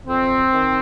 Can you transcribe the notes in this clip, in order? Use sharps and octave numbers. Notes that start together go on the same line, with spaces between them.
F2 C4
D#3